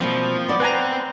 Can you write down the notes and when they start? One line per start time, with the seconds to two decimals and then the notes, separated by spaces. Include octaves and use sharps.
0.01 B2 E3 F3 G3 A#3 C4
0.48 B3 D5
0.60 C4 B4 G#5 A#5 F#6